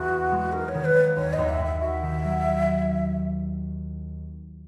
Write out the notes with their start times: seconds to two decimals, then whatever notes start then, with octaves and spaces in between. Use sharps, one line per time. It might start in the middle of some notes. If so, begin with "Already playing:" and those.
Already playing: E2 F#4
0.10 B3
0.32 G#3
0.53 D#4 A#4
0.69 C#5
0.74 D#3
0.85 B4
0.96 A#3
1.17 D#2 C#5
1.33 D#2 D#5
1.49 E5
1.60 D#2 E5
1.81 F#4 E5
2.02 D#3
2.24 F#3